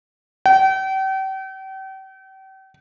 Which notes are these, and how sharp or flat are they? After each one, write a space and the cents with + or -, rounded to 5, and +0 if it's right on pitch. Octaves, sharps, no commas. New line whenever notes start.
G5 -40